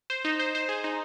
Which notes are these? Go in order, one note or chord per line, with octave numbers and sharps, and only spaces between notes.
C5
D#4
C5
C5
G#4
D#4